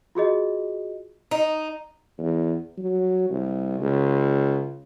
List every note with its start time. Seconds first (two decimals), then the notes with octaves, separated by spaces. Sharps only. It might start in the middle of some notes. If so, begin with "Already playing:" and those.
0.15 F4 F#4 G#4 D#5
1.31 D#4
2.18 E2
2.78 F#3
3.30 C2
3.81 C#2